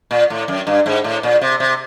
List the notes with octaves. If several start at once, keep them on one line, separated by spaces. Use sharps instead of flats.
A#2
A2
F#2
G2
G#2
A2
A#2
C3
C3